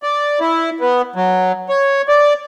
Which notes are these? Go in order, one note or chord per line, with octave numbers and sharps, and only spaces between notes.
D5
E4
B3
F#3
C#5
D5